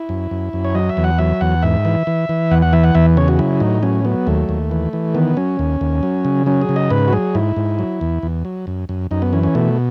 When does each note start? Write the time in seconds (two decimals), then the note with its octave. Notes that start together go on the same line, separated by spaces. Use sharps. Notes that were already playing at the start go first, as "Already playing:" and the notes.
Already playing: E4
0.09 F#2
0.31 F#2
0.53 F#2
0.64 C#5
0.75 F#3 D#5
0.89 E5
0.97 E2
1.04 F#5
1.18 F#3 E5
1.41 E2 F#5
1.62 G#2 E5
1.85 E3
2.07 E3
2.29 E3
2.51 E2 F#5
2.62 F#5
2.73 E3 E5
2.84 F#5
2.95 E2 E5
3.17 C#3 C#5
3.28 F#4
3.39 F#3 E4
3.60 A2 D#4
3.83 F#3 C#4
4.05 F#3 B3
4.27 D#2 A3
4.49 D#2
4.71 E3
4.93 E3
5.14 D#3 B3
5.37 F#3 C#4
5.59 D#2
5.81 D#2
6.03 F#3
6.25 C#3
6.46 F#3 C#4
6.62 G#4
6.69 C#3
6.76 D#5
6.90 G#2 B4
7.08 F#4
7.13 F#3 G#4
7.35 G#2 E4
7.56 G#2
7.79 F#3
8.01 E2
8.23 E2
8.45 F#3
8.67 F#2
8.89 F#2
9.11 F#2 D#4
9.22 B3
9.33 E3 C#4
9.43 C#4
9.55 B2 A3